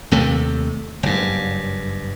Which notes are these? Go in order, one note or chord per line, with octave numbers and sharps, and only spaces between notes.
D#2 C3 A3
F#1 G2